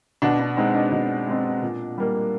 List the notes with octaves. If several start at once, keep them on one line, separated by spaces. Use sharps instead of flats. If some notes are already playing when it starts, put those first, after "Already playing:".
B2 D4
D4
G#3 C4 D#4
D4
B2
G#3 C4
A#2
G3 A#3